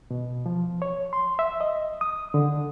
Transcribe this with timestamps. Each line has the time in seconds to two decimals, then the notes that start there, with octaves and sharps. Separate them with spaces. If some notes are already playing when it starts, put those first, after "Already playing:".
0.11 B2
0.46 F3
0.82 C#5
1.13 C6
1.39 E5
1.61 D#5
2.01 D#6
2.34 D3